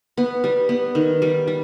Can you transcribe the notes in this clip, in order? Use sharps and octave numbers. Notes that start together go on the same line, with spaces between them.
B3
G3
B3
D#3
G3
G3